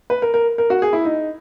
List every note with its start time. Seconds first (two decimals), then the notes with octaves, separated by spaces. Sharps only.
0.10 B4
0.22 A#4
0.34 A#4
0.58 A#4
0.70 F#4
0.82 G#4
0.93 E4
1.05 D#4